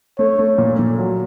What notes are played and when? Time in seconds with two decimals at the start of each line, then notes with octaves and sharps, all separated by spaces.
0.19 A3 C#5
0.39 A3
0.58 A#2
0.79 A#2
0.98 F#3